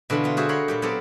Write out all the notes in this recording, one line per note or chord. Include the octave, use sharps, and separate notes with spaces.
B2 D3 E3 F4 B5
B3 F4
F#4 G#4 C5 E5
A#4 C#5 B5 C6
A#2 G3 G4
F#3 B3 C4 A4 D5 F5